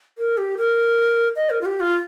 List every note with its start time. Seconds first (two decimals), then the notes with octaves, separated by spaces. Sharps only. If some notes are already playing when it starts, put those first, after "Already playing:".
0.18 A#4
0.38 G4
0.57 A#4
1.36 D#5
1.50 A#4
1.61 F4
1.66 G4
1.80 F4